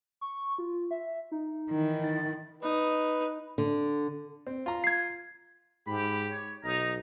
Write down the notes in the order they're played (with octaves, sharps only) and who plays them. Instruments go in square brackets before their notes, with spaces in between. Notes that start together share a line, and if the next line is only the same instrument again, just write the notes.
[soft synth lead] C#6
F4
E5
D#4
[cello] D#3 E3
[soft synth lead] A6
[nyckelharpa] D#4 [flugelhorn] B4
[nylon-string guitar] D3
[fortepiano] C4
F4 A#5
[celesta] G#6 C7
[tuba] G#2 [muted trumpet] G4 [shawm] B5
[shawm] C#5
[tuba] B1 [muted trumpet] D#4 [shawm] A#5